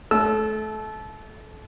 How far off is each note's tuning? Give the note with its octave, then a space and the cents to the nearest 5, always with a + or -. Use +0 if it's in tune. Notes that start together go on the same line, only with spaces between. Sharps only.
A3 -30 E6 +0